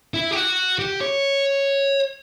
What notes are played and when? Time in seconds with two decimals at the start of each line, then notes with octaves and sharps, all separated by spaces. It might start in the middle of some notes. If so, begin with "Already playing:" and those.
0.14 E4
0.31 G4
0.36 F#4
0.79 G4
1.01 C#5